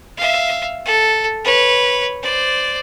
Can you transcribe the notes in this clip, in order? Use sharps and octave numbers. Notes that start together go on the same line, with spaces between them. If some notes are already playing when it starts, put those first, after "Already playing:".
E5 F5
A4
B4 C#5
C5 D5